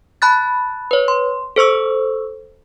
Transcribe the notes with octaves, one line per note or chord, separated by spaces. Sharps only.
A5 B5 F#6 A6
B4 C#5
C6
A4 C5 C#6 E6